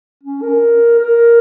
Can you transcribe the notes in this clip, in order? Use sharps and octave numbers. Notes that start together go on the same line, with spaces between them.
C#4
A#4
A#4